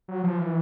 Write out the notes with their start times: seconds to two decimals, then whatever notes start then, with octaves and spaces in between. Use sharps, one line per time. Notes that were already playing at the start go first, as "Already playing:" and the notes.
0.08 F#3
0.24 F3
0.38 E3